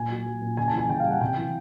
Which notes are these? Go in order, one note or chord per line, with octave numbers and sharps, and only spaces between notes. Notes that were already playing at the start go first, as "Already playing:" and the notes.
Already playing: A#2 G#5
F#3
F#3
A#2
C#3 G#5
A5
E3 G#5
C#3 G5
F5
G3
F#5
C3 G5
E3